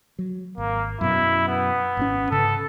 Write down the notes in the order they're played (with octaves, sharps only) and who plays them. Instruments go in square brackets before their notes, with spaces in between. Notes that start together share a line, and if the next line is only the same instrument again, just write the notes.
[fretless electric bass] F#3
[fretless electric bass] G#1 [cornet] A#3
[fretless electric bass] F#2 B2 [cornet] E4
[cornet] B3
[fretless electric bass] G#1 B2 C#4
[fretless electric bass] G#2 C#3 [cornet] A4